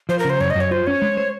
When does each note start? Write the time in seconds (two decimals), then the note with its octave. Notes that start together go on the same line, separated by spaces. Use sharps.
0.09 F3 C5
0.19 A#4
0.24 C#3
0.30 C5
0.40 F#2 C#5
0.50 D#5
0.55 F#2 C#5
0.71 F4 C5
0.87 C#4 C#5
1.02 G#3
1.17 C5